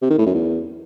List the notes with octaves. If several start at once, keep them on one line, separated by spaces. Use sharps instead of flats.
C3
D#3
A2
F#2
E2